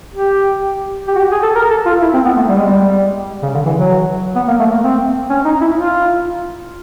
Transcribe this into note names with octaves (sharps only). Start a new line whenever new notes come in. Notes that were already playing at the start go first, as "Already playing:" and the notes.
G4
G4
F#4
G4
G#4
A4
A#4
A4
F4
E4
C4
B3
A3
G3
G#3
G3
C#3
D3
E3
F#3
B3
A#3
A3
A#3
C4
C#4
D#4
E4
F4